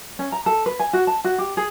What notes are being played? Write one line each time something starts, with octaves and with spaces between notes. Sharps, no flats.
C#4
A#5
A4
B4
G#5
F#4
A5
F#4
G4
G#4